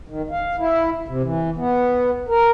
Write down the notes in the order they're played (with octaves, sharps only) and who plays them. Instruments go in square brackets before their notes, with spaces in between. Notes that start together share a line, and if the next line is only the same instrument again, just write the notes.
[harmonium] D#3
F5
E4
C3
E3
B3
A#4